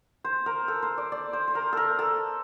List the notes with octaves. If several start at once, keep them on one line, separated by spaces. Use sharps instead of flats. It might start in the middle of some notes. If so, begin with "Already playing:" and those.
C5
A#4
A4
C5
D5
D5
C5
C5
A#4
A4 A#4
A4